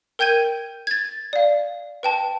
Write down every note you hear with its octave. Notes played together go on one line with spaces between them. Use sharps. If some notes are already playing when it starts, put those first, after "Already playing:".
A#4 G5 G6 G#6 D#7
G#6 A6
D5 F5
B4 G5 A5